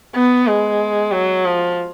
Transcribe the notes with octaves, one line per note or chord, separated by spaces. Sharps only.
B3
G#3
F#3
F3